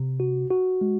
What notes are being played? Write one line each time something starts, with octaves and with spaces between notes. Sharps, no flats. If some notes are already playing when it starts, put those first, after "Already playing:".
Already playing: C3
F#4
F#4
G#3